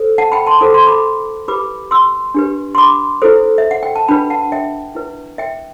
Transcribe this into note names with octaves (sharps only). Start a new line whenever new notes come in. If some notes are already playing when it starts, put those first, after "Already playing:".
Already playing: A4 C5
F#5 A5
G5 B5
A5 C6
E4 A4 C5 D6
C6
B5 D6
E4 G4 B4 B5 D6
C6 E6
D4 G4 B4
C6
B5 D6
E4 A4 C5
E5
F#5
G5
A5
D4 F#4 B4 G5 B5
F#5 A5
E5 G5
E4 B4
E5 G5